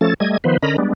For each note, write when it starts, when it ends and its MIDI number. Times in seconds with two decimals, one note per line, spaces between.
0.01 0.14 53
0.01 0.14 57
0.01 0.14 61
0.01 0.14 69
0.01 0.14 93
0.20 0.37 55
0.20 0.37 57
0.20 0.37 75
0.20 0.37 92
0.44 0.57 51
0.44 0.57 53
0.44 0.57 59
0.44 0.57 71
0.44 0.57 72
0.63 0.77 50
0.63 0.77 61
0.63 0.77 70
0.63 0.77 75
0.63 0.77 82
0.63 0.77 83
0.78 0.93 55
0.78 0.93 56
0.78 0.93 59
0.78 0.93 62